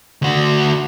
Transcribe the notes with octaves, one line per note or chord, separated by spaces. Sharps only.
D2 F#4